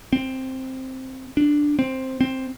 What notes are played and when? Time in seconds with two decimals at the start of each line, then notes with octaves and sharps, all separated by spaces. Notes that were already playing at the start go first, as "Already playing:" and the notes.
0.13 C4
1.37 D4
1.79 C4
2.21 C4